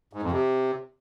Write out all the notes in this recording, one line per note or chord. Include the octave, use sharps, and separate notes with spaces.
G#2
F2
C3